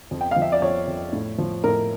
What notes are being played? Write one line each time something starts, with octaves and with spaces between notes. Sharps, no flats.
F2
G5
F3 F5
E5
D5
F2 C#5
F2
A2
F3
A2 A#4